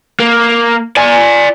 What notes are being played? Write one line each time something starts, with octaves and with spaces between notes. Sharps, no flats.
A#3
D5 G#5